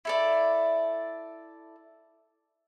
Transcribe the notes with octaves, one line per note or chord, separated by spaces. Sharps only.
E4 A4 D5